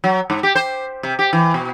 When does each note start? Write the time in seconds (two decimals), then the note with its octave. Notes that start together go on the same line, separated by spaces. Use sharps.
0.04 F#3
0.30 G#2
0.43 G4
0.55 C5
1.03 C3
1.19 G4
1.33 E3
1.54 B2